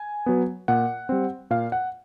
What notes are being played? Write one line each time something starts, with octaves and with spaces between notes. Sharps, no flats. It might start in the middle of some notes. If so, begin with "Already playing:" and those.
Already playing: G#5
F#3 B3
A#2 F#5
G3 C4
A#2 F5
F#5